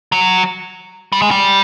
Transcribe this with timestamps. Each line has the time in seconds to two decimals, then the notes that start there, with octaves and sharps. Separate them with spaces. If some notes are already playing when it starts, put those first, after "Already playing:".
0.12 F#3
1.13 G3
1.22 G#3
1.31 G3